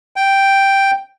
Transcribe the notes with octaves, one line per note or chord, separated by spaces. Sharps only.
G5